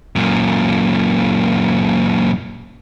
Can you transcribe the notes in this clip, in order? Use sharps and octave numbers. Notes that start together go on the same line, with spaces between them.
F#2 A#2